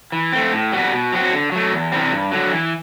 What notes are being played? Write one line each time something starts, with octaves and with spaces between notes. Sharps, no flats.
E3
A3 C4
A2
G3 B3 F#4
B2
F#3 C4 F#4
D3
F#3 A3
E2
C3 E3 G3 C4
G2
D3 F#3
E3